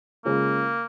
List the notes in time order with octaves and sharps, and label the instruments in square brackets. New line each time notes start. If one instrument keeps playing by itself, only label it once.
[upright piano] C#3 G#3 C#4 F4 [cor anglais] A#3